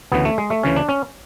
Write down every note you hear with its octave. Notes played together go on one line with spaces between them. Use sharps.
D2 C#3 E3 B3
A3
G#3
A3
D2 C#3 E3 C#4
D4
C#4